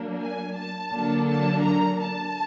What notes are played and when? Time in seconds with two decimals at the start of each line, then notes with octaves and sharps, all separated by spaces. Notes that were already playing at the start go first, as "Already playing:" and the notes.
Already playing: F#3 A#3 D4
0.21 G#5
0.56 A5
0.93 D3 F#3 A#3 D4
1.28 A5
1.64 A#5
2.01 A5